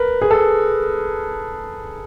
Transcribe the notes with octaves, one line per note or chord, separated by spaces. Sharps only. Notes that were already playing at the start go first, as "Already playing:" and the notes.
Already playing: A#4 B4
G#4
A4